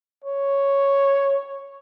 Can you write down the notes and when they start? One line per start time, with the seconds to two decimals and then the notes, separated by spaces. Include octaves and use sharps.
0.24 C#5